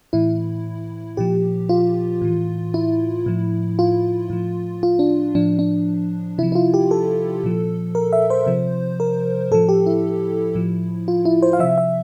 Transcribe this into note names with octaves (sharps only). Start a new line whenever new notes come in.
A2 E3 E4
A#2 F3 G4
F4
A2 E3
E4
A2 F3
F4
A2 F3
F4
D4
A2 F3 D4
D4
C3 F3 E4
E4
F4
G4
A4
A#2 F3
A#4
E5
C5
C3 F3
A#4
A2 F3 A4
G4
E4
A2 F3
F4
E4
C5
F5
C3 F3 E5
E5